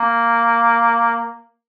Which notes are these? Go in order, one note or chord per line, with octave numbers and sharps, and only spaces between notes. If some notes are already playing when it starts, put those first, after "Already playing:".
Already playing: A#3